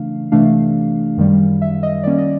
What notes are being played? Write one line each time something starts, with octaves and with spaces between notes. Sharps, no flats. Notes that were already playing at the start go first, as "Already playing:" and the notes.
Already playing: C#3 E3 A3 D4 F5
C3 E3 A3 D4 F5
F#2 D#3 G3
E5
D#5
D#3 G3 A#3 C#4 D5
D#5